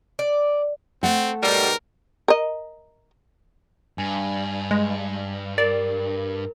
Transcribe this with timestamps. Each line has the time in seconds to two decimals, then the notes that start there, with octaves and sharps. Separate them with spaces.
0.19 D5
1.03 A3 C4 F#5
1.43 G#2 B2 G3 A#4
2.28 A#4 D#5
3.98 G2 G#5
4.71 G#3
5.58 A#4 D5